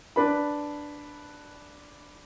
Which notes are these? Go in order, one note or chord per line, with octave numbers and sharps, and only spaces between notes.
D4 B4 A5 B5